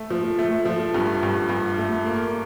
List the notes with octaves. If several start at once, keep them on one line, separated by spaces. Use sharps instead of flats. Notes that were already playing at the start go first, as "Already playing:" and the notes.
Already playing: A3
F3
A3
F3
G2
G2
G2
A3
A#3